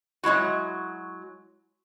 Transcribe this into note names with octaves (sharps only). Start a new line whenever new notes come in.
F#3 G#3 E4 F#4